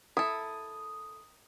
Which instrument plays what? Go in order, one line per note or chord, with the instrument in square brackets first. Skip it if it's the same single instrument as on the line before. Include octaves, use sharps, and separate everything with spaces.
[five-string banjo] E4 A4 [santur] D#6